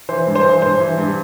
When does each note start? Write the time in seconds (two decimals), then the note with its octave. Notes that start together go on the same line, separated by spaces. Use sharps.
0.09 E3 C5
0.27 G2
0.35 C5
0.45 E3
0.62 G2 C5
0.80 E3
0.98 G2